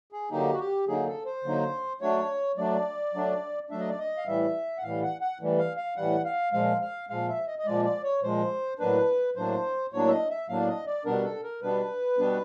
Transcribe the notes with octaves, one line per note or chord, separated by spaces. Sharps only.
G#4
D3 F#3 A#3 D#4 G4
F#4
G4
D3 F#3 A#3 D#4 G#4
A4
C5
D3 F#3 A#3 D#4
F#3 A3 D4 C#5
F#3 A3 D4 D5
F#3 A3 D4
F#3 A3 D4 E5
D#5
D5
D#5
F5
A2 E3 G3 E5
F#5
A2 E3 G3 F5
F#5
F#5
A2 E3 G3
F5
F5
A2 E3 G3 F#5
F5
A#2 F3 G#3 F5
F5
A#2 F3 G#3 F5
E5
D#5
D#5
A#2 F3 G#3 D5
D5
C#5
A#2 F3 G#3 C5
A2 F#3 A#3 D4 B4
A2 F#3 A#3 D4 C5
A2 F#3 A#3 D4 C#5
E5
D#5
E5
A2 F#3 A#3 D4 F5
D5
D#5
D5
B2 G3 B3 D4 A#4
A4
A#4
B2 G3 B3 D4 B4
B2 G3 B3 D4